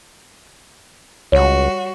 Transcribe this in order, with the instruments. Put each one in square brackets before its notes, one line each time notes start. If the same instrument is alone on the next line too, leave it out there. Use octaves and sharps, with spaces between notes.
[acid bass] C#2 [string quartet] G3 F#4 [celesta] C#5